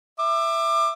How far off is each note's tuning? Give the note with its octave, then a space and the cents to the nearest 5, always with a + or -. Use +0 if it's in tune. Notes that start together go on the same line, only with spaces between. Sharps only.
E5 +5 D6 +30